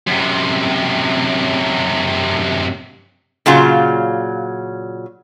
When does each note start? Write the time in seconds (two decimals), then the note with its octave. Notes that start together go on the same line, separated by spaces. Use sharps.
0.07 F#2 C3
3.46 A#2 C#3 F#3 F4